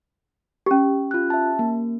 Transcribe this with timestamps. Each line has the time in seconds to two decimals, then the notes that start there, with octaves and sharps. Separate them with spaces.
0.66 C#4 G4
1.11 F4 F#6
1.30 E5 A5
1.59 A#3